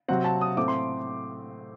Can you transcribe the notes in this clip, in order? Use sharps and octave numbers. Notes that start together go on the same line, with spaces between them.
C3 F#3 C4 F#5
A5
D#6
A2 A3 C4 D6
C6